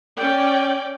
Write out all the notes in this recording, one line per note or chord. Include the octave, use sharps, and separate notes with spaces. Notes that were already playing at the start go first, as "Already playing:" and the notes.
C#4 D5 G5